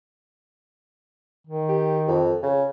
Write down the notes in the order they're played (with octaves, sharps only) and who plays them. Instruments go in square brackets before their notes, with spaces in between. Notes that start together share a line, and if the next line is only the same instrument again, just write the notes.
[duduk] D#3
[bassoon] G4
F2
C#3